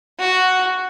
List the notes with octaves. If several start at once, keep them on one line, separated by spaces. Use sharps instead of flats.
F#4